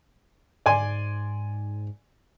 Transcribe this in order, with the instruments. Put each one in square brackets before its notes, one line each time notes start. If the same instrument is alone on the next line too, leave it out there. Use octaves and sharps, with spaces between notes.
[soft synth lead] G#2 [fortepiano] D5 G#5 C6